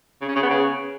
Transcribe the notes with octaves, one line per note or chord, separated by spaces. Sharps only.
C#3
C#4
C#3
B3
C#3